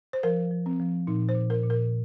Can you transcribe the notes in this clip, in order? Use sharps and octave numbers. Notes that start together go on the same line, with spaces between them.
C5
F3 A#4
F3
C4
F3
A#2 D#4
C5
A#2
A#4
A#2
A#4